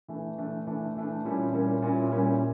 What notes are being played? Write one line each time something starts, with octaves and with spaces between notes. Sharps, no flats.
E3 A3 D4
E3 A3 D4
E3 A3 D4
E3 A3 D4
A#2 G3 A#3 C#4 E4
A#2 G3 A#3 C#4 E4
A#2 G3 A#3 C#4 E4
A#2 G3 A#3 C#4 E4